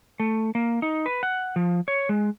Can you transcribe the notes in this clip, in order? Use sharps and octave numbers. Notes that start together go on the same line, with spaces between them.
A3
A#3
D#4
B4
F#5
F3
C#5
G#3